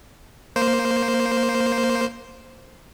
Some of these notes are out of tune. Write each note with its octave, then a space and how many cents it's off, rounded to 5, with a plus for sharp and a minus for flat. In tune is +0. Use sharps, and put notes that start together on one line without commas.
A#3 +0 C5 +0